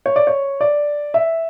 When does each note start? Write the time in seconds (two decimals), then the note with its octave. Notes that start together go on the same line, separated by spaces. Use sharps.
0.06 C#5
0.16 D5
0.27 C#5
0.61 D5
1.14 E5